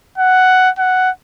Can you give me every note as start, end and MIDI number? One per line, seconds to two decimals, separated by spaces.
0.18 0.70 78
0.79 1.10 78